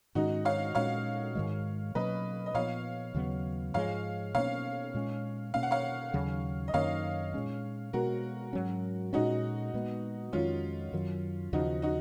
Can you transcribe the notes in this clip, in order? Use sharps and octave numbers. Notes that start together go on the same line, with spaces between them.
G#2 D#3 G#3 C#4 D#4 F#4
C#5 F5
A#2 G#3 C#4 C#5 F5
G#2 D#3 G#3
B2 F#3 A#3 C#4 B4 D#5
D#5
A#2 F3 B3 C#5 F5
D#2 C#3 F#3 B3
G#2 F3 G#3 C#5 F5
B2 F#3 A#3 C#4 C#5 F5
A#2 G#3 C#4
B2 A#3 C#4 F5
F#5
C#5 F5
D#2 C#3 F#3
D#5
F#2 D#3 A#3 C#4 C#5 F5
A#2 G#3 C#4
B2 G#3 B3 F#4 A#4
G#2 F#3 C#4
A#2 G#3 C#4 D#4 F#4
A#2 G#3 B3
F2 D#3 G#3 C#4 F4
F#2 D#3 F#3
D#2 C#3 F3 D#4 F#4
D#4 F#4